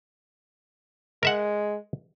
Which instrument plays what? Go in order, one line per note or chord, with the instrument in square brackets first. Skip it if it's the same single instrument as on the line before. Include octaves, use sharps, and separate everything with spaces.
[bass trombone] G#3 [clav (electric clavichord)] A#4 E5 F#5